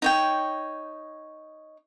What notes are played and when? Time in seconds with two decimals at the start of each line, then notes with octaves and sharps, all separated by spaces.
0.02 D#4 C#5 G5